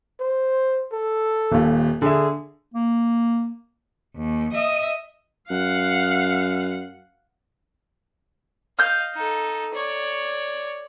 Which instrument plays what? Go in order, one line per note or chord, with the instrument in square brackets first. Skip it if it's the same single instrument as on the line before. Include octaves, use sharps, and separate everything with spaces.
[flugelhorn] C5
A4
[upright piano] D#1 D#2
[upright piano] D3 E5 [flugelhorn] G#4
[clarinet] A#3
[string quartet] D#2
D#5 E5 D#6
[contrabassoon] F#2 [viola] F5 F#5
[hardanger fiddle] D#5 F5 [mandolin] F6 G6
[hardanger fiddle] D#4 A4
C#5 D5